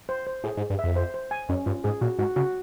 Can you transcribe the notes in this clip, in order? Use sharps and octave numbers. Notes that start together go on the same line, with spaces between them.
C5
C5
A2 G#4
G#2
G#4
G2
F2 E5
C5
C5
G#5
F#2 C#4
G2 F4
G#2 G#4
A#2 F#4
G#2 F#4
C#3 F#4